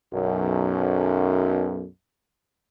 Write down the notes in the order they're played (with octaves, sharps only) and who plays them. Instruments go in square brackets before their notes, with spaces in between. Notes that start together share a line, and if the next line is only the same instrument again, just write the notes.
[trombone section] B1 F#2